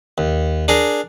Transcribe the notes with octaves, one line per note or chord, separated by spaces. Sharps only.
D#2
D4 G#4 A#4